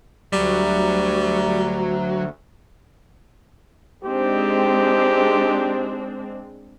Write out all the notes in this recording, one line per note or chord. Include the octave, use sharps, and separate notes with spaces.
D2 F#3 G3
G#3 C4 D4 D#4 G4 C5